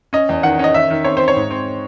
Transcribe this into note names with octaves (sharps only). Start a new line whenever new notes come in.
C#4 D#5
E2
D#3 F#5
C#4 D#5
D#3 E5
D#3
C4 C#5
C4 C5
C#5
G#2
C4